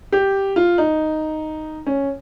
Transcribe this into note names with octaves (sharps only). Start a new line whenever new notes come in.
G4
F4
D#4
C#4